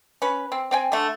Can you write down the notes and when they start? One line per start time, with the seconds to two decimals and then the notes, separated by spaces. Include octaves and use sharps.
0.22 C#4 B4
0.52 C4
0.71 C4 G5 G#5
0.92 D3 A3